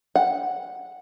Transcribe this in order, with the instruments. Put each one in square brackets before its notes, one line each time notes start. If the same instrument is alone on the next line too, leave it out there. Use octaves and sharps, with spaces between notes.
[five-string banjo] F#5